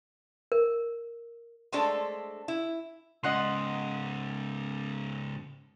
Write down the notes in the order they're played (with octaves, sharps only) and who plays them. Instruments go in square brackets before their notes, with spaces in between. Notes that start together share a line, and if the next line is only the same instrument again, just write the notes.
[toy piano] A#4
[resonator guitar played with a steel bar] G#3 A3 C4 D4 A4
E4
[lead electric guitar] G#2 C#3 [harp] D#5 F#5 C6